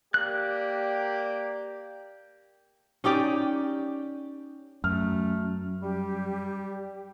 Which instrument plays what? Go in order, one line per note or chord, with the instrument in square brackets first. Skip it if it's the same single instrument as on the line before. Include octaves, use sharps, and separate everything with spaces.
[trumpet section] A#3 G4 D5 [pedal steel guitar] F#6
[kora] C#4 D#4 G4 D5
[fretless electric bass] F#2 [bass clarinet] A3 [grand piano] F6
[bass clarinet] G3 [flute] G4